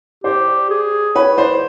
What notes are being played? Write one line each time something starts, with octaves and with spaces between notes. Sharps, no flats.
G4 C5 D5
G#4
B4 C#5
C5 D5